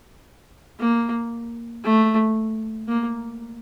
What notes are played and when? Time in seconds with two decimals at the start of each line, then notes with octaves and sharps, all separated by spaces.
0.79 A#3
1.84 A3
2.88 A#3